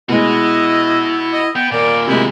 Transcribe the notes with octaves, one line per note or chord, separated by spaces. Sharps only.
B2 G#3 E4 F#4 B4 D#5
D#5
B3 F#5 G5
D#2 A#2 A#4 D5
C3 G#3 E4